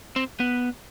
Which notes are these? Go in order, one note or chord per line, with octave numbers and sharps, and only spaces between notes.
C4
B3